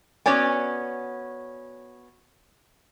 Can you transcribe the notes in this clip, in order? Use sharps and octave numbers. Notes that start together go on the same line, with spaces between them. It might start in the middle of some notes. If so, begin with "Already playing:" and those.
B3 C#4 F#4 C#5 D5 G#5